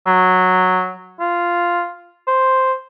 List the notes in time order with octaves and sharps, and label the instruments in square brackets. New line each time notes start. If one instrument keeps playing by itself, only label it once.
[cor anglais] F#3
F4
C5